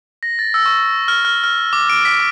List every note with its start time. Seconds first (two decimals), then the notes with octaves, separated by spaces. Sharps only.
0.23 A#6
0.39 A6
0.54 E6
0.66 C#6
1.08 F6
1.25 F6
1.43 F6
1.73 D6
1.90 D7
2.05 B6